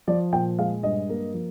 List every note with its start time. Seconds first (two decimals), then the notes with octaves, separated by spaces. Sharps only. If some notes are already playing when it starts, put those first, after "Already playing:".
0.08 F3 D5
0.33 A#2 G5
0.58 G#3 F5
0.83 G2 D#5
1.09 A#3
1.34 F3